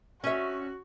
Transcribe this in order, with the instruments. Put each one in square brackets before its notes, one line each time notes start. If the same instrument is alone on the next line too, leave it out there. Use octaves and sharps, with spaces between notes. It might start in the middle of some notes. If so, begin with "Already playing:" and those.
[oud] C#4 E5 [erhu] F#4